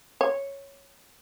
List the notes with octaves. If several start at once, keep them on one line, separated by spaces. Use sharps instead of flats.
C#5